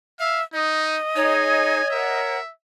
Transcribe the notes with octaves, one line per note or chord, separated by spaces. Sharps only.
E5 F5
D#4 D#5
D#4 G#4 C#5 G#5
A#4 E5 F#5